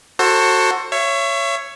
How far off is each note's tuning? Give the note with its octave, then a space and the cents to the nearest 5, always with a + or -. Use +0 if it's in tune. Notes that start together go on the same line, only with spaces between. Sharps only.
F#4 +0 A4 +20 C5 +25
C#5 +0 E5 +35